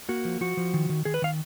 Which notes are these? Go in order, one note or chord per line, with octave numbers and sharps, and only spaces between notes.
A#3 F#4
F3
F3 F#4
F3
D#3
D#3
D#3 G#4
B4
D#3 F5